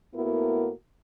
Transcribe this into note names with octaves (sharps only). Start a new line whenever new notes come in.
A2 A#3 B3 E4 F#4 A#4